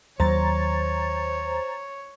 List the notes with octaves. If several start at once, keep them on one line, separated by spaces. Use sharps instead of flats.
D#2 F#3 C5 C#5 A#5 A6